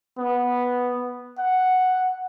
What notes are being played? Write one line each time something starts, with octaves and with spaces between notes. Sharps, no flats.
B3
F#5